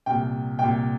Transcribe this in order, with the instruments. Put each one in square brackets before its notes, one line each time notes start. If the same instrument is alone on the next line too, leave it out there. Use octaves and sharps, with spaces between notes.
[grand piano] C2 A#2 G5
C2 G5
A#2